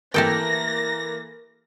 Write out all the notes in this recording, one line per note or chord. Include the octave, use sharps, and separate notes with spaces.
E3 A3 A#3 G4 A4 G5 A#6